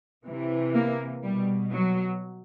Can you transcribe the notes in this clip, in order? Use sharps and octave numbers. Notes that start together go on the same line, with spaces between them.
C3 E3
A#3
B2 G3
F#3